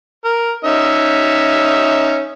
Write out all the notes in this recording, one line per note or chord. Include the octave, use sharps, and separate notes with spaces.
A#4
C#4 D#4 E5